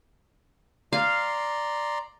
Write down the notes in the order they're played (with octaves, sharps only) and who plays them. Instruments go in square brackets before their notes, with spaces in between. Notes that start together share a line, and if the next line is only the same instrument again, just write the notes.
[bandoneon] D5 A#5 C6 [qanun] F5